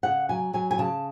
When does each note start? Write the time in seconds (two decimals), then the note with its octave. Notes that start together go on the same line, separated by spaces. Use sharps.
0.03 C#3 F#5
0.29 F#3 G#5
0.53 F#3 G#5
0.71 G#5
0.78 C#3 A5